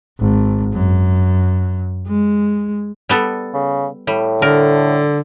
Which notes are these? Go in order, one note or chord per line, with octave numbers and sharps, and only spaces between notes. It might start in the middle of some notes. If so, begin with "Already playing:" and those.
G#1
F#2
G#3
G3 B3 A4
C#3
A2 G3
D3 A#4